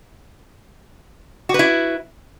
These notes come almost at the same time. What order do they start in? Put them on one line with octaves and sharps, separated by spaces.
F#4 B4 E4